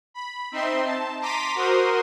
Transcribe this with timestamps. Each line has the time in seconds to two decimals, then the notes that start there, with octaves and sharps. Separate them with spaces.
0.14 B5
0.52 C4 D#4 E5 C6
0.85 A5
1.21 A#5 C6 D6 B6 D#7
1.55 F#4 A#4 C5 C6 D#6